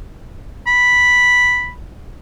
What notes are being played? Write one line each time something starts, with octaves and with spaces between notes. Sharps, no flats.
B5